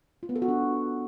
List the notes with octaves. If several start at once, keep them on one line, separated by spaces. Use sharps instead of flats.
F4
B3
A4
F#4
D4